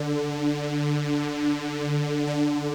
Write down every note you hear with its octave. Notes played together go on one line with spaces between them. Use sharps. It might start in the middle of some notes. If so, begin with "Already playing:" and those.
Already playing: D3
D3